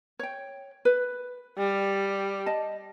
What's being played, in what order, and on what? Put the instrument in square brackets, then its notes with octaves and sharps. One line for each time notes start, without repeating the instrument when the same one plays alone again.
[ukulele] C#5 G5
B4
[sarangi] G3
[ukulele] D#5 A5